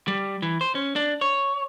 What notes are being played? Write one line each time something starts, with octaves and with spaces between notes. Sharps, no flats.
G3
E3
C5
C#4
D4
C#5